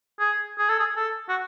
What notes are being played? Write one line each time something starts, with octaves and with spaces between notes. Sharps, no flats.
G#4
G#4
A4
G#4
A4
F#4